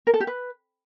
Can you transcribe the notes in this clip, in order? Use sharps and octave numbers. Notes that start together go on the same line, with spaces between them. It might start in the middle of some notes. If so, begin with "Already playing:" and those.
A#4
A4
G4
B4